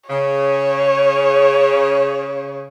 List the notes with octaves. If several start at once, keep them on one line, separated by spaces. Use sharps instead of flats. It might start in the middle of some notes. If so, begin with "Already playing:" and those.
C#3 C#5